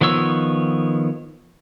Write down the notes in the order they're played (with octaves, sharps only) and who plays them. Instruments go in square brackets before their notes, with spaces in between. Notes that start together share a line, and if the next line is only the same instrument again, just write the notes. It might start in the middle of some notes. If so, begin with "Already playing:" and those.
[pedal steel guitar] D#3 F3 B3 C#5 E6